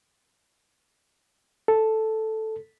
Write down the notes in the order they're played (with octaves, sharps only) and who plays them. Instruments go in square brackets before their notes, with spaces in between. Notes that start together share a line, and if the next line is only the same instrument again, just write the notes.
[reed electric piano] A4